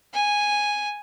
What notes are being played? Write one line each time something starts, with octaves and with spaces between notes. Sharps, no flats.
G#5